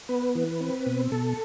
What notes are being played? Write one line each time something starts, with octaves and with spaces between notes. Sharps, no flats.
B3 B4
E3
C4
B2
B2 A4